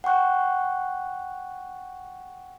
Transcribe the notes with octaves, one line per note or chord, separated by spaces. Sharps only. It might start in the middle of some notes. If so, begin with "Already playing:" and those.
F#5 G5 C#6 F#6